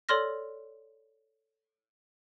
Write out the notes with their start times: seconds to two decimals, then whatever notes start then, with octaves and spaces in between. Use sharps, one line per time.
0.09 A4 C#5 D5 C6 F6 A#6